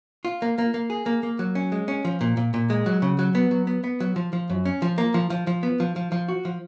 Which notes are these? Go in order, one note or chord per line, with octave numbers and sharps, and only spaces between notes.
F4
A#3
A#3
A#3
G#4
A#3
A#3
F#3
C#4
G#3
C#4
F3
A#2
A#2
A#2
G#3
F#3
C#3
F#3
B3
F#3
B3
B3
F#3
F3
F3
F#2
C#4
F3
A#3
F3
F3
F3
B3
F3
F3
F3
F#4
F3